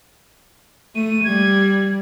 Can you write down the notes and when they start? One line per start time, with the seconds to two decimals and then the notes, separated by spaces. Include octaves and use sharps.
0.95 A3 D#7
1.24 G3 G#6